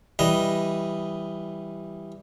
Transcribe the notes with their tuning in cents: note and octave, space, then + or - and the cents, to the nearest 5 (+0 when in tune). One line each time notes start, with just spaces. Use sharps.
E3 +0 G3 +0 D#5 +0